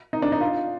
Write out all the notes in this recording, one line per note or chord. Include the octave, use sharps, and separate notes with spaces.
D#4
D4
D#4
F4